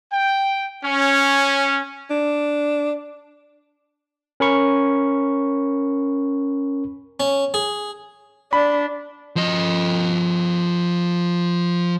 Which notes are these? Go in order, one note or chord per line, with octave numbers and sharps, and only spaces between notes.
G5
C#4
D4
C#4 A#4 B5 C#6
C#4
G#4
D4 B5
F3 D#5